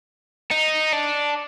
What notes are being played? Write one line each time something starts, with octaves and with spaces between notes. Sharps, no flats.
D#4
D4